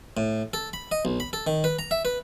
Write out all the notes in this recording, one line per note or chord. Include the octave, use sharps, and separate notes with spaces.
A2
A4
B5
D#5
B1
B5
A4
D#3
B4
A#5
E5
B4